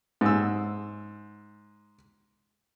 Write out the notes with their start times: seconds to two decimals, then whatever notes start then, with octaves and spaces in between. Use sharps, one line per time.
0.21 G#2 E6